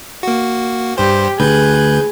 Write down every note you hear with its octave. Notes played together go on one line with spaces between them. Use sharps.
A#3 F#4
G2 G4 C5
D2 G#4 B4 F#6 G6